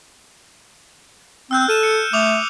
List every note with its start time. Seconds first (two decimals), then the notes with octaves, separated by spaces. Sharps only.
1.51 C4 E6 F#6 G6
1.69 A4 F6 D#7 E7
1.83 C#7
2.13 A3 D6 D#6 F7